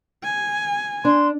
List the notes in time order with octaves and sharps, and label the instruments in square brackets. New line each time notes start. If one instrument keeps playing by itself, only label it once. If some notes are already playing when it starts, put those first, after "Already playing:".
[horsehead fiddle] G#5
[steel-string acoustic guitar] D4 [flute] C6